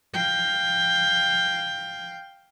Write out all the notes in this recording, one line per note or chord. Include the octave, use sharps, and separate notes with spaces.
F5 G5